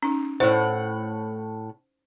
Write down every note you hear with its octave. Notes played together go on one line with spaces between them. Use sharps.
C#4 D#4
A2 E4 C5 F#5